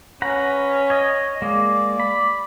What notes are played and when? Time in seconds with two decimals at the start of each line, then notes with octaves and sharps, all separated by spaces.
0.22 C#4 B4 F#5 A#5
0.90 C#5 D#5
1.42 G#3 A#3 D5
2.00 B5